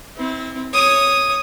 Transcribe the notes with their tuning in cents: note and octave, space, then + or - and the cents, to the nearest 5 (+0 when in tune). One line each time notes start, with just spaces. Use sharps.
C4 +0 E4 -30
C#5 -5 D#6 +0